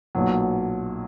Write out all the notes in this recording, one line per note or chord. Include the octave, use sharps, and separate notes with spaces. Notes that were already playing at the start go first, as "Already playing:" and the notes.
B1 A#2 F#3